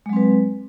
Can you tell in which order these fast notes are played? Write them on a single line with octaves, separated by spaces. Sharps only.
G#3 F#3 C4 B4